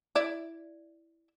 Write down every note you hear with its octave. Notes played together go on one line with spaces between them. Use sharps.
E4 D5